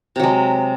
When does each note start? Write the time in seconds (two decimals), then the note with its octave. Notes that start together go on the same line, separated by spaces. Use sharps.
0.16 C3
0.20 F#3
0.23 G#3